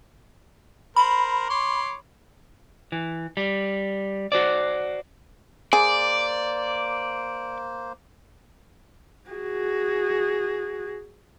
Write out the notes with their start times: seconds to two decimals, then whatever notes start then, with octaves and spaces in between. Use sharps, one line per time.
0.96 A#4 C5 B5
1.50 C#5 C6 D6
2.92 E3
3.37 G3
4.32 F#4 C5 D5
5.73 A#3 G#4 C5 D5
9.30 F#4 G#4